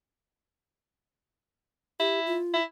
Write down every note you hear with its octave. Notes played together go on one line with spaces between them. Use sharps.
E4 G4
F4
E4